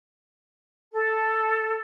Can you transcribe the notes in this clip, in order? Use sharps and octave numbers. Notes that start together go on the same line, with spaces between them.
A4